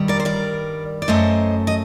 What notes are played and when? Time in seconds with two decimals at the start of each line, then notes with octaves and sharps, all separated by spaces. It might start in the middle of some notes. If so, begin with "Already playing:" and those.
Already playing: G2 D#3 G3
0.08 A#4 D5
0.20 C5
0.25 A#4 D5
1.02 D5
1.08 F#2 F#3 A3 C5 D#5
1.67 D#5